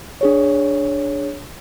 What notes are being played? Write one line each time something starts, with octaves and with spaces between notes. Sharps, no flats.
D4 G#4 C#5